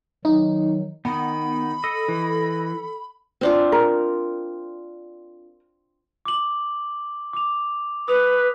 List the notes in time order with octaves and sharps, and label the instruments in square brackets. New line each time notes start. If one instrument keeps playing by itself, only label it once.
[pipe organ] D#3 F#3 [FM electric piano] D#4
[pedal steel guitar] D#3 D#4 [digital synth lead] B3 [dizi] B5
[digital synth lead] A4 [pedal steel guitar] D#5
[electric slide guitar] E3
[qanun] C4 D4 F4
[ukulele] A#4
[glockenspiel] D6 F#7
D6 F7
[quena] B4 [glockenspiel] D#6 F7